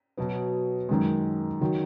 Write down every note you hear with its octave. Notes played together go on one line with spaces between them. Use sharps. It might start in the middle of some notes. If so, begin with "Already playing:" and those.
B2 F#3 B3
F#2 D#3 G#3
D#3 F#3